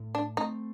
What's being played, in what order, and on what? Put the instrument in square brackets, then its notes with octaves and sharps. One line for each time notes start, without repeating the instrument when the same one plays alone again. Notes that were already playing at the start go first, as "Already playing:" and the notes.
Already playing: [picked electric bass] A2
[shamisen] D4
[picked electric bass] A3 C4 [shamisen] D#4